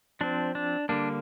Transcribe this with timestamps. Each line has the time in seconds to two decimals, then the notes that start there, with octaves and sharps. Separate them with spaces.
0.21 F3 C4 D4
0.55 D4
0.89 D3 G3 A#3 D4